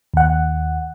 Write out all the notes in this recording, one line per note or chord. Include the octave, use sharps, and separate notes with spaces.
D#2 F#5